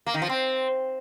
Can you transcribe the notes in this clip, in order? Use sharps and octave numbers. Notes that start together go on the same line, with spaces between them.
A#3
D#3
F3
C4